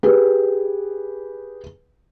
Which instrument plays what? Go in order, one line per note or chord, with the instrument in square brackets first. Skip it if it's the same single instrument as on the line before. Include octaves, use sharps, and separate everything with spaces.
[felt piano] G4 G#4 B4